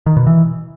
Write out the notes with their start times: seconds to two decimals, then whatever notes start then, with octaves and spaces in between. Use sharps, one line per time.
0.06 D#3
0.17 B2
0.27 E3